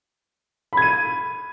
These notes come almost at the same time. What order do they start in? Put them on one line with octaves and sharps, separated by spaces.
B5 G#6 D#7